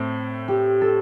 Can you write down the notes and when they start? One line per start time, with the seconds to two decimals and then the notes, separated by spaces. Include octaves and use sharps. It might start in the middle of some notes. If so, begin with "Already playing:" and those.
Already playing: A2 A3 C4
0.48 G4
0.81 A4